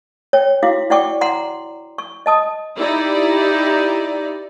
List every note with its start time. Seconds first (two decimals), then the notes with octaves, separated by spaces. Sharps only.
0.33 C#5 G5
0.63 E4 F#4 F5 D6
0.90 E4 D5 F#5 G5 C#6 D6
1.21 F#5 A#5 C6
1.98 C#6
2.26 D#5 A5 D#6
2.78 D#4 E4 G4 D5